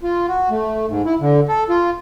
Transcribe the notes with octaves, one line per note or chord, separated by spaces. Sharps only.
F4
F#4
A3
G#2
E4
D3
A4
F4